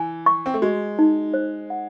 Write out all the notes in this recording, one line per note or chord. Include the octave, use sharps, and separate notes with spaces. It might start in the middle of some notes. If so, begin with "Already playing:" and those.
Already playing: E3 G#5
C#6
C4
A3
G#3 F#4
D#4
C5
F#5